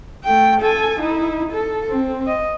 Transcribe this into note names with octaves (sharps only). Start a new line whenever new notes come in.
A3 G5
A4 G#5
D#4 E4
A4
C4
D#5